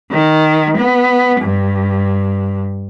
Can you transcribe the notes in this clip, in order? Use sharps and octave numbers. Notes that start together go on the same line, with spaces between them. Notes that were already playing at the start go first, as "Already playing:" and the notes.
D#3
B3
G2